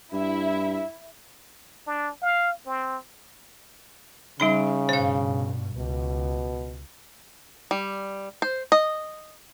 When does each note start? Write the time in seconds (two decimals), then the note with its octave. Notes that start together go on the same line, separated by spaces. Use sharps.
0.12 G2 E4 E5
1.87 D4
2.22 F5
2.66 C4
4.40 C#3 G3 D#4 B5
4.89 G2 B2 C5 F5
5.77 C#2 B2
7.71 G3
8.42 C5
8.72 D#5